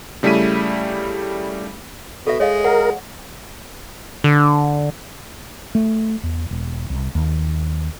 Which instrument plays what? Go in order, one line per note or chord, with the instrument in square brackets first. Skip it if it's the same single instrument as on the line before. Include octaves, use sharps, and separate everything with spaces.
[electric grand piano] C#3 G3 A3 E4 B6 D#7
[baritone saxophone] B2 [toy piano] A4 E5
[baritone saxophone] G#3 [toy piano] C#5 D#5 F5
[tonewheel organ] A#4 [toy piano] F#5
[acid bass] D3
[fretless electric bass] A3
E2
E1
C2
D#2